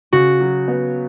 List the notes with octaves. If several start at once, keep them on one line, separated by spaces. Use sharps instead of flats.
C#3 F#4
F#3
B3